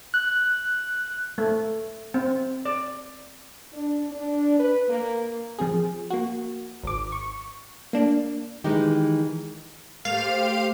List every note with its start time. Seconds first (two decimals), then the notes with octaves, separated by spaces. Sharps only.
0.14 F#6
1.38 A3
2.14 C4
2.65 D5
3.73 D4
4.10 D4
4.59 B4
4.89 A#3
5.59 F3 C4 G#4
6.10 A#3 F#4
6.83 G#1 D6
7.12 C#6
7.93 A#3 D4
8.64 D#3 E3 G#3 D#4 G4
10.05 A3 A#3 G4 C5 F5